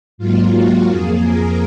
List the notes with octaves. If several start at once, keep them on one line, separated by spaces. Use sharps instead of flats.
G#2 F#3 A#3 F4
F#4
F2 F3 A#3 G#4
A#4